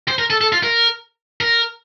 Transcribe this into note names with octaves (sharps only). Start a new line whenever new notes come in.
C5
A#4
A4
A4
F4
A#4
A#4